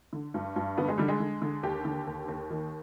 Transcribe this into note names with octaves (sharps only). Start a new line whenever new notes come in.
D3
G2
G2
D3 B3
G#3
D3 G3
G#3
D3
D3
D#2 G4
D3
D#2
D#2
D#3